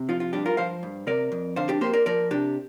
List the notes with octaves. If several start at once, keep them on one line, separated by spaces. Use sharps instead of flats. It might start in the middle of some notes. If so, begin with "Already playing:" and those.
Already playing: C3
F3 F4
F4
G2 D4 G4
F4 A#4
F3 C5 F5
G2
C3 A#4 D5
F2
D3 C5 F5
D4 G4
A#3 G4 C5
A#4 D5
F3 A#4 D5
C3 D4 G4